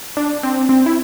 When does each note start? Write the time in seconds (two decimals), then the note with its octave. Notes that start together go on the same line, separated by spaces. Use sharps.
0.17 D4
0.43 C4
0.69 C4
0.86 E4